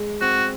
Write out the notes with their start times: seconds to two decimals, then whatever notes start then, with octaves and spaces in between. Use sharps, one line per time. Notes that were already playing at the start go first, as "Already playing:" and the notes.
Already playing: G#3
0.21 C4 F#4